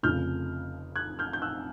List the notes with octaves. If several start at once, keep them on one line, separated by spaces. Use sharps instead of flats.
F1 F2 C#3 F3 F6 G6
F#6 G#6
F6 G6
G6
E6 F#6